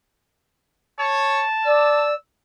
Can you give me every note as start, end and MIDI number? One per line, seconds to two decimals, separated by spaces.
0.99 1.45 73
0.99 2.06 81
1.65 2.14 74
1.65 2.15 88